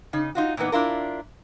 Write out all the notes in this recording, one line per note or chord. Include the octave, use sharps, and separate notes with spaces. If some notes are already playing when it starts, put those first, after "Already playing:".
C#3 D#4
D#4 F4 F#4
A#2 E3 A#3 B3 D#4
D4 E4 F4 A#4